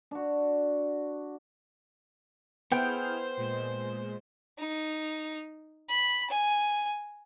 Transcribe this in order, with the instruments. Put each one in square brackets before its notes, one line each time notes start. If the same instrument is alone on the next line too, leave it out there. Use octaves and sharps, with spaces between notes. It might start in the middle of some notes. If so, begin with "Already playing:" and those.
[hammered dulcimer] D4 F#4
[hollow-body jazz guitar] B3 [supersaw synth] E4 G#4 F6 [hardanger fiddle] C5 [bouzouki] G5
[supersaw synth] A#2 G#3
[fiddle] D#4
B5
G#5